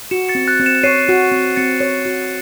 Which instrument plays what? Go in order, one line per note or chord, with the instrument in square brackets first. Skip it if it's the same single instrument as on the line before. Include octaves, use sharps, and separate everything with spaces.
[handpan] F#4 [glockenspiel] C#7 E7
[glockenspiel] A6 C#7
[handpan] C4
[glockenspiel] F#6 A6
[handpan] C4
[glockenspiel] C#7 E7
[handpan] C#5 [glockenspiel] C7 D#7
[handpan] F#4
C4
[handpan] C4 [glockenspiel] A6 C#7
[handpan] C#5
F#4